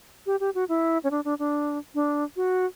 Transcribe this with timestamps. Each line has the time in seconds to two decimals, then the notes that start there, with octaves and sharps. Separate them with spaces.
0.26 G4
0.40 G4
0.55 F#4
0.69 E4
1.04 C#4
1.11 D4
1.25 D4
1.39 D4
1.95 D4
2.36 F#4